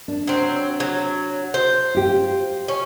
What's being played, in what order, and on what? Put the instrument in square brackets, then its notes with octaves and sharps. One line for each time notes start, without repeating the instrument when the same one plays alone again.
[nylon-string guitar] D4
[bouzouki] F#3 C4
F#3
C5
[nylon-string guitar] F4 G4
[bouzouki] C#4